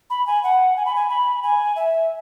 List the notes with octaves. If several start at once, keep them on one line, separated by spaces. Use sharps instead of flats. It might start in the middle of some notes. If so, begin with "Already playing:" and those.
B5
G#5
F#5
G#5
B5
G#5
B5
G#5
E5